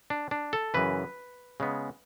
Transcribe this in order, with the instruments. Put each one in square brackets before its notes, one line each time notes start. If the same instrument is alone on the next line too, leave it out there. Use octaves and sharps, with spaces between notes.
[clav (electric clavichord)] D4
D4
A4
F#2 C#3 E3 B4
C#3 G#3 B3